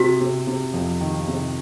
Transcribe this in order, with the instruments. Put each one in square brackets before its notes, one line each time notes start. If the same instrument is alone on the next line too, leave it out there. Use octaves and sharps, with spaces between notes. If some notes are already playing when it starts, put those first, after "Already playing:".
Already playing: [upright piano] C3 [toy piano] F#4
[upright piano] C3
C3
F2
D#3
C3